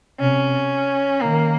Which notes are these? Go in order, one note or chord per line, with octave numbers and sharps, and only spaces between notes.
C3 C#4
D#3 A#3